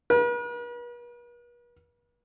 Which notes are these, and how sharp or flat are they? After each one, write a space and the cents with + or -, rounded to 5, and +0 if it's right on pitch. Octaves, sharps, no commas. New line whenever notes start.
B4 -45